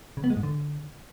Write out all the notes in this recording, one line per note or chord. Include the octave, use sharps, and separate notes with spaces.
C#3
B3
G#3
G#2
D3